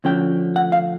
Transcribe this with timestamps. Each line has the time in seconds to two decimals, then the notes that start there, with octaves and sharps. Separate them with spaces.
0.04 D2 D3 F3 A3 C#4 G5
0.56 F#5
0.72 F5